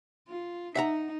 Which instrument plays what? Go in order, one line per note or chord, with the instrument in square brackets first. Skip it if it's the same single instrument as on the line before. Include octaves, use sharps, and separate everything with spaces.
[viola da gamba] F4
[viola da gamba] D#4 [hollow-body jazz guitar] E5 F#5 A#5